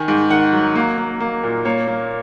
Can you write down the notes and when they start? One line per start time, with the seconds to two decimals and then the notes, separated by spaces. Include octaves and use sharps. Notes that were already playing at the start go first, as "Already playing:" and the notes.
Already playing: D#3 G#5
0.08 G#2
0.30 D#3 F#5
0.53 F#3
0.76 A#3
0.98 A#3
1.20 A#3
1.43 A#2
1.65 A#3 C#5
1.88 A#3